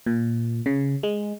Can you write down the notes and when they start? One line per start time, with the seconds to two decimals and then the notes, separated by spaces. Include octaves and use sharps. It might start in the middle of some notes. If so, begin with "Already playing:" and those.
0.06 A#2
0.66 C#3
1.03 G#3